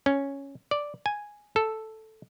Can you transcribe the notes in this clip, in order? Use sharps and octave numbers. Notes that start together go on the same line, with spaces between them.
C#4
D5
G#5
A4